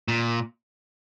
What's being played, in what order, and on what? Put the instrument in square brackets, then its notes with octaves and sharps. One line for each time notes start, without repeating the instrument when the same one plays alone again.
[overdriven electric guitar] A#2